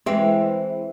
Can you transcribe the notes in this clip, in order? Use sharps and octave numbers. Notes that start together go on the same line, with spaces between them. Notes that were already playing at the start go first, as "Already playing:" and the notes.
E3 G#3 C4 E5